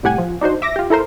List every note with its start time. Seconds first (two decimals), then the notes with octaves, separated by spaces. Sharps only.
0.03 C2 A2 G4 F#5 G#5
0.18 F3
0.41 D4 D#4 F#4 C5
0.62 E5 D6 A#6
0.76 F4 G4
0.90 E4 A4 A#4 C5